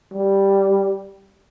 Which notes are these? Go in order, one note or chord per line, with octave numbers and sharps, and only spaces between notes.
G3